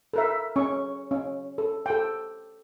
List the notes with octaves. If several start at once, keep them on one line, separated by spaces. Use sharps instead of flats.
A4 A#4 E5
C#4 C#6
C#4
A4
A4 G5